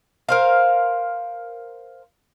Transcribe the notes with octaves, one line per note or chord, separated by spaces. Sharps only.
A#4 C5 F5